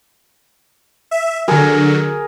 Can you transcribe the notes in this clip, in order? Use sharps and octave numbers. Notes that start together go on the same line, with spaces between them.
E5
D3 F#3 G#4 A#4